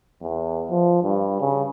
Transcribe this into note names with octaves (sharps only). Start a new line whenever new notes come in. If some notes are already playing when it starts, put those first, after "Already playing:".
E2
F3
G2
C#3